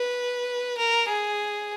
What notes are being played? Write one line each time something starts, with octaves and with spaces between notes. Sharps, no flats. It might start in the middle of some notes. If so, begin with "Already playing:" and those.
Already playing: B4
A#4
G#4